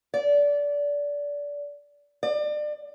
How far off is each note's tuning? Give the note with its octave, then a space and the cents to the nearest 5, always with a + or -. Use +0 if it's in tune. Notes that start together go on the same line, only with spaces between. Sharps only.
D5 -20
D5 +30